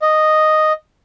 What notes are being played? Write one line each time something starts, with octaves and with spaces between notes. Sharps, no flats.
D#5